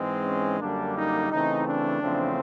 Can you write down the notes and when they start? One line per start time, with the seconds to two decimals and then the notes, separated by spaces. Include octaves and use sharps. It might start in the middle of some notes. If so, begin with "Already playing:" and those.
Already playing: G#2 E3 G#3 C4
0.25 C#4
0.60 F#2 D3 G3 A#3 D4
0.96 D#4
1.30 C#3 E3 A3 C4 D#4
1.66 D4
2.02 E2 C#3 F3 A3 C4